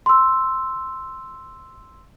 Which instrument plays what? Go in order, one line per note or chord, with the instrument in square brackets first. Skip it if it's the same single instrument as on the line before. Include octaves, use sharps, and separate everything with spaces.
[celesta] C6 E6